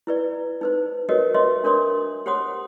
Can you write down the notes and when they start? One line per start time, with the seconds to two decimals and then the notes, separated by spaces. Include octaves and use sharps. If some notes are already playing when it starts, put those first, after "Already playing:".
0.07 E4 B4 D5
0.61 D#4 B4 C5
1.09 F#4 G4 A#4 B4 C#5 D#5
1.34 B4 C#5 D#5 E5 C6
1.64 D4 A#4 C#5 C6 D#6
2.26 G4 C5 C#5 F#5 C6 D#6